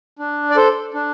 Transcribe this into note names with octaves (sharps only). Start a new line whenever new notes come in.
D4
D5
A4 C5
D4